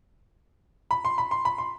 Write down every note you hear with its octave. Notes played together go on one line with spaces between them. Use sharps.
B5
C6
B5
C6
B5
C6